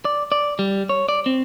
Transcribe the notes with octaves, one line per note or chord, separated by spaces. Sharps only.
D5
D5
G3
C#5
D5
C4